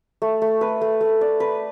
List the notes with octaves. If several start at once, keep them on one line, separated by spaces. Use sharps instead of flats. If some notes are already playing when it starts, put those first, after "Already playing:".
A3
A3
B4
A3
A3
D5
B4